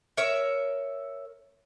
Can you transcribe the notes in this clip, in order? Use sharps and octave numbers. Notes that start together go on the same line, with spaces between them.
A#4 C#5 E5